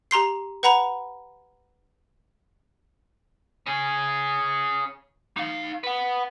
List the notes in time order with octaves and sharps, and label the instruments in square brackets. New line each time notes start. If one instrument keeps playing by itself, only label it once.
[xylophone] G4 A#5 C6 C7
B4 F#5 A#5 B5 F7
[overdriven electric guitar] C#4 G#4
D#4 F5
B4 F#5